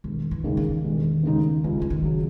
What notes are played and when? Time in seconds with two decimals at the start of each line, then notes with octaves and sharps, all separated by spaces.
0.04 E1 D#3
0.31 E3
0.44 D#2 C#3 G#3 D#4
0.57 D#3
0.84 E1
1.23 D#2 C#3 G#3 D#4
1.64 C#2 E3
1.82 E3
1.90 D#3
2.04 C#3 F#3